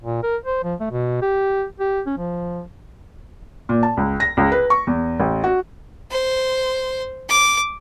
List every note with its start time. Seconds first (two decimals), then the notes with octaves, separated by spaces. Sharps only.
0.02 A#2
0.23 A#4
0.45 C5
0.64 F3
0.80 A3
0.91 B2
1.22 G4
1.80 G4
2.06 C#4
2.18 F3
3.69 A#2
3.83 A5
3.97 C#2
4.20 A#6
4.37 C#2
4.52 B4
4.70 C#6
4.87 E2
5.20 A1
5.44 F#4
6.11 C5
7.29 D6